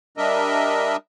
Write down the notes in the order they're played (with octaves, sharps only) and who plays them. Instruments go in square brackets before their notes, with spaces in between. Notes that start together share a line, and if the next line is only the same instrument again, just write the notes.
[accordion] G3 D4 A#4 D#5 E5